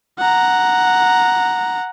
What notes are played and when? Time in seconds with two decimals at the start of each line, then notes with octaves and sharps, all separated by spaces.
0.18 F#5 A#5